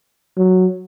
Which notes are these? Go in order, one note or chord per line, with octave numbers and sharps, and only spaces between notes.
F#3